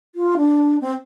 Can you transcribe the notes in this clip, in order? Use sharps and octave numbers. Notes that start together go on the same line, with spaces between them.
F4
D4
C4